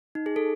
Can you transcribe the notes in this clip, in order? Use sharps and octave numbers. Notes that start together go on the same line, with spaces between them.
D#4
G#4
A4